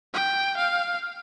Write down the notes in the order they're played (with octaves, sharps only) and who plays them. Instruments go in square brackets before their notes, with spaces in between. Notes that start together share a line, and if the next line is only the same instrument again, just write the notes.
[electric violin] G5
F5